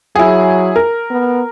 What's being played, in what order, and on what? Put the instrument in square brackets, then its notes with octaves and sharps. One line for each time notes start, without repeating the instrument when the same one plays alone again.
[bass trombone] F#3 [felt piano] E4 G#4
[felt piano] A#4
[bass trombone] B3